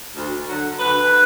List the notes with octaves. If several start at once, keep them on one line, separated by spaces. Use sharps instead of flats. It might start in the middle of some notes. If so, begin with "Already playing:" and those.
D2
D3 F#3
D2 B4
D3